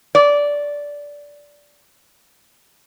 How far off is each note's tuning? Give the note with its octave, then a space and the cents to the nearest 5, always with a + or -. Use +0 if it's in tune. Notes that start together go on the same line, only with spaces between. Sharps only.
D5 -15